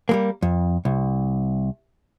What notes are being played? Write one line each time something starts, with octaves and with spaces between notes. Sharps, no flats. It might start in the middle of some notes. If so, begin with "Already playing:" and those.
G3 G#3 A#3
F2
C2